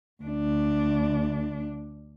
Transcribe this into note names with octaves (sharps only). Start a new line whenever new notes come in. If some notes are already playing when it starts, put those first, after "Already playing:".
D2 D4